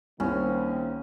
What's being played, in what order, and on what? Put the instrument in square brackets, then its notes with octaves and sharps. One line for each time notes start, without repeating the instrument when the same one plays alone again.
[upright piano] C2 [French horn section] D#3 A#3 C4 [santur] C#4